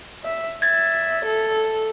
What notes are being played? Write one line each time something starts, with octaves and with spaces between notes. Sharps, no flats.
E5
E5 G#6 A6
A4